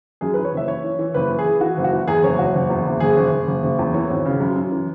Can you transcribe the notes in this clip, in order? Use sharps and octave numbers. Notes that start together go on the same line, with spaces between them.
F#2 G#4
B4
E3
C#5
F#1 E5
E3 C#5
E3
E3
F#1 B4
E3
G#4
E3
E3 F#4
F#1
F#4
E3
E2 G#4
F#1 C#5
F#1 F#4
F#1
E2
F#1
F#1 G#4
F#1
F#1
F#1
F#1
E2
E3 C#5
G#1
C#3
F#2
F#2
E3